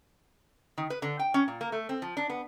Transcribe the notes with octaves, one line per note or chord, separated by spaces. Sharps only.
D#3
B4
D3
G5
C#4
A#2
A#3
A3
C4
F3
D4
B3